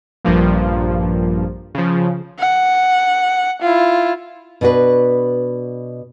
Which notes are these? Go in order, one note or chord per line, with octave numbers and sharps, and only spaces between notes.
A#1 G2 F3 A#3
C#3 F3
F#5
E4 F4
B2 D4 F#4 B4